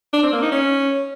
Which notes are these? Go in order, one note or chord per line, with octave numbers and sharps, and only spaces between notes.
D4
C4
A#3
D#4
C#4